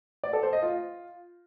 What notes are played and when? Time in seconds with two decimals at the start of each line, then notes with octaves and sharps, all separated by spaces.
0.24 D5
0.33 A4
0.43 C5
0.53 D#5
0.62 F4